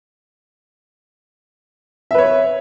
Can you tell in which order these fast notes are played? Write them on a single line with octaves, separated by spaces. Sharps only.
E5 B4 C#5